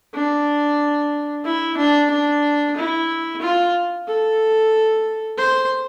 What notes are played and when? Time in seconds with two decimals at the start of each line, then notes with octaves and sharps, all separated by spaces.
0.14 D4
1.45 E4
1.77 D4
2.10 D4
2.76 E4
3.41 F4
4.07 A4
5.38 C5